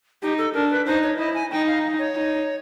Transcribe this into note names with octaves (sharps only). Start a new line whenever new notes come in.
D#4 G4
A4
D4 A#4
B4
D#4 C5
C#5
E4 D#5
G#5
D#4 G5
F5
C#5
D#4